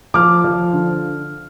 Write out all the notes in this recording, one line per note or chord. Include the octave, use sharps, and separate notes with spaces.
F3 D6 F6
F3
D3